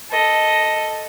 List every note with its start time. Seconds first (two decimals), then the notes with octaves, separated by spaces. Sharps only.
0.11 A4 D#5